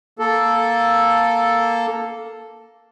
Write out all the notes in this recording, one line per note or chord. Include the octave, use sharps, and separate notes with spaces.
A#3 A4